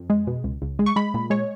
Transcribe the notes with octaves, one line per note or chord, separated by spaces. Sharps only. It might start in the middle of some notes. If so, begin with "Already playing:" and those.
Already playing: F2
G#3
B2
C#2
C#2
G#3
C#6
G#3 B5
A#2
G#3 C#5